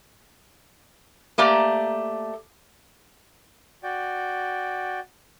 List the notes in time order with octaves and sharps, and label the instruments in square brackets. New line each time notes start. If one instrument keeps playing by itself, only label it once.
[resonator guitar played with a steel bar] A3 A#3 G4 D5 A#5
[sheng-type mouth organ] F#4 D5 G5